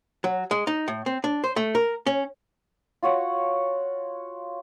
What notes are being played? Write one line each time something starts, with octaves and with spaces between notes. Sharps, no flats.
F#3
G#3
D#4
A2
C4
D4
C5
A3
A#4
C#4
F4 F#4 C#5 F#5